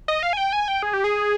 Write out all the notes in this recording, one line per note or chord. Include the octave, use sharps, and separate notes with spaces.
D#5
F5
G#5
G5
G#5
G5
G#4
G4
G#4